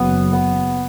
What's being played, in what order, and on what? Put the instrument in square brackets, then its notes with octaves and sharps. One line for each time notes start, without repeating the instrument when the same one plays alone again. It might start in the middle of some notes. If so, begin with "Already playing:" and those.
Already playing: [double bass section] F#1 E2 C#3 F#3 [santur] B3
[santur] B3